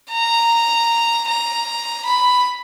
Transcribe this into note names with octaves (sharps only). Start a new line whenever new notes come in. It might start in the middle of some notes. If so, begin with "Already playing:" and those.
A#5
A#5
B5